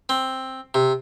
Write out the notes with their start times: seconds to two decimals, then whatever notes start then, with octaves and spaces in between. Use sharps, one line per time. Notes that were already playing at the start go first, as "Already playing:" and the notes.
0.09 C4
0.74 C3